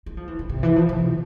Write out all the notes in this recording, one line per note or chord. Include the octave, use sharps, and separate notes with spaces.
G#3
F3
E3
D3
C3
E3
F3
F3
B2